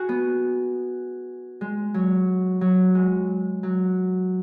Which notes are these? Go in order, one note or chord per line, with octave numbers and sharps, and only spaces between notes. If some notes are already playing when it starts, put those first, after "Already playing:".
Already playing: F#4 G#4
B3
G#3
F#3
F#3
G#3
F#3